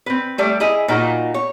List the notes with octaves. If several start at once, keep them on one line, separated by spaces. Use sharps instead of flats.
C4 B4
G3 A3 D5
E4 G#4 D#5
A#2 D#4 F#4
C#5